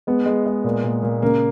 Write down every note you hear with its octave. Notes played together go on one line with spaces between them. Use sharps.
G#3 B3
G#3
G#3
A#2
A#2
A#2
C#3 A#3